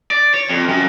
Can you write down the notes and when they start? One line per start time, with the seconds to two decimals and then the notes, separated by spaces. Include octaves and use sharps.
0.11 D5
0.34 C#5
0.49 F2
0.69 F#2